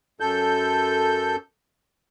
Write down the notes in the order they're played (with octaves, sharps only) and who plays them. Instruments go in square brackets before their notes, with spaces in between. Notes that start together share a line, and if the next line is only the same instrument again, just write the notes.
[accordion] F#2 A4 G6